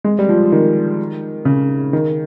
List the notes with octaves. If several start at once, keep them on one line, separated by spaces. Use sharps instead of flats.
G#3
G3
F3
D#3
C#3
D#3